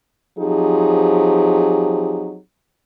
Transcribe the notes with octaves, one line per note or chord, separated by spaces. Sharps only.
F3 F#3 C4 D#4 G4 G#4